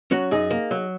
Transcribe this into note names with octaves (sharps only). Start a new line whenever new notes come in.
F#3 C#4 F#4
F#2 D#4 G#4
A#3
F#3